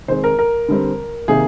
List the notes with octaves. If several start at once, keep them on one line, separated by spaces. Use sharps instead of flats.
D#3 G#3 C4 C5
A#4
A#4
D3 G3 C4
C3 D#3 A#3 G#4